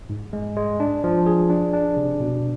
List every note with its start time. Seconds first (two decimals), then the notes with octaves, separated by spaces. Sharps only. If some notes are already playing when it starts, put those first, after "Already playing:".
0.10 G#2
0.33 G#3
0.56 G#3
0.80 D4
1.04 F3
1.26 G#4
1.50 D4
1.73 D4
1.97 C3
2.20 B2